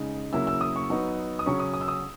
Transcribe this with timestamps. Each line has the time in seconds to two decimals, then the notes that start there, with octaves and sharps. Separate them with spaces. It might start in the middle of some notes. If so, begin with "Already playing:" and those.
Already playing: C#3 G#3 D#4
0.33 C#3 F#3 A#3 E4 E6
0.47 E6
0.61 D#6
0.76 C#6
0.90 F#3 B3 D#4
1.39 D#6
1.46 C#3 F#3 C#4 C#6
1.60 D#6
1.74 D#6
1.81 E6
1.88 D#6